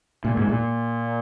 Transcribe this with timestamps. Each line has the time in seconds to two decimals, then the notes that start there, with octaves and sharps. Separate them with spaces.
0.25 A#2
0.37 G#2
0.49 A#2